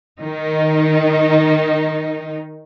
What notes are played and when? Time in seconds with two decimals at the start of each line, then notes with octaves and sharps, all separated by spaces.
0.19 D#3 D#4